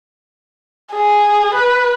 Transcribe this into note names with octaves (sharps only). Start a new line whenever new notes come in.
G#4
B4